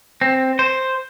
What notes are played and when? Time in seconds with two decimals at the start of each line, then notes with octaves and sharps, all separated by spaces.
0.21 C4
0.59 C5